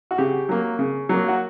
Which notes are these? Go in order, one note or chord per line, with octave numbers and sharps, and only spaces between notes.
F#4
C#3 G4
F#3 A#3
C#3
F#3 A#3
F#4